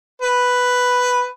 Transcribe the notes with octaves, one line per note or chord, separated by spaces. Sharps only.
B4